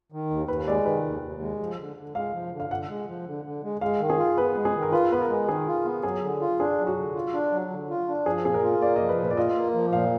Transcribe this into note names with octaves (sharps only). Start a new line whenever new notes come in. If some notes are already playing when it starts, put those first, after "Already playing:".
D#3
D#2
D#2 B4
G#3 D5
D#3 B4
D#2
D#2
G#3
F3
D3
D3
G#3 F5
F3
D3
F5
D3 F#5
G#3
F3
D3
D3
G#3
G#3 F5
D#3
G#4
F4
B3 B4
G#3
G#4
D#3
A#4
F4 B4
B3 B4
A#4
G#3
D#3 G#4
F4
B3
F#3 G#4
D3
F4
D4 G#4
F#3
F#4
D3
F4
D4
F#3
D3
F4
D4
F3 G#4
A#2 G#4
A#4
F4
A#3 D5
F3 D#5
B4
A#2 B4
D5
F4 D#5
A#3
F3
A#2 F5